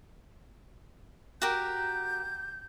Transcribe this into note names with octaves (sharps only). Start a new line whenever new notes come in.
F#4 G4 A#4 G6